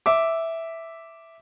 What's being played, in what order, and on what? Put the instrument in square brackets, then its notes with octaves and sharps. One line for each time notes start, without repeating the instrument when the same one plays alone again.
[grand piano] E5 D6